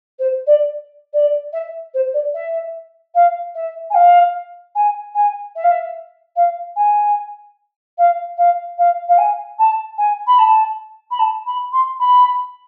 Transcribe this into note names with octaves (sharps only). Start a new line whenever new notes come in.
C5
D5
D5
E5
C5
D5
E5
F5
E5
G#5
F5
G#5
G#5
E5
F5
E5
F5
G#5
F5
F5
F5
F5
G#5
A5
G#5
B5
A5
B5
A5
B5
C6
B5